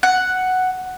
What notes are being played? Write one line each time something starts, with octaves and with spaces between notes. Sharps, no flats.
F#5